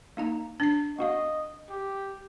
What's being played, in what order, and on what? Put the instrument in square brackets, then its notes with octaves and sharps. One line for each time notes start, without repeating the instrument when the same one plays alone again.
[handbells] A#3 D#4 A#5
[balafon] D4 [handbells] A#6 C7
[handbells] B3 F#4 F5 [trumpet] D#5
[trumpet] G4